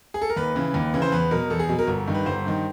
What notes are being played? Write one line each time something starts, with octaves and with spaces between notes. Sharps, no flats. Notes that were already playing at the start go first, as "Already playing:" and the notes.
G#4
A4
A#4
D#2 B4
C#3 E3
D#2
C#3 E3
C5
E2 B4
B2 F#3 A#4
E2 A4
G#4
B2 F#3
A#4
G1
G2 D#3
B4
G1 C5
G2 D#3